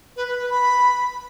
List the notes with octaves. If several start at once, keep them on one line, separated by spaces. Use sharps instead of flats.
B4
B4
B4
B5